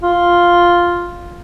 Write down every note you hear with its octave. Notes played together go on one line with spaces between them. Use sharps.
F4